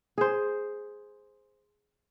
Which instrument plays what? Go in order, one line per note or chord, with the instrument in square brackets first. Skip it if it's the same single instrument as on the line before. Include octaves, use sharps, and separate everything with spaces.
[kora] G#4 C5